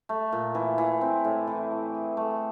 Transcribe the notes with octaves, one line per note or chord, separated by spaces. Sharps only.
A3
A#2
E3
E3
C4
A2
E3
A3
G#4
A3